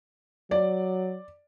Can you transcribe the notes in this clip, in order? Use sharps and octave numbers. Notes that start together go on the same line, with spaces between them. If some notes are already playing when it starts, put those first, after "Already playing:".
F#3 D5